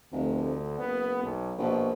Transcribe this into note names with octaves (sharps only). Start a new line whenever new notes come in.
F1 D2
F#1 B3
B1
A#1 B2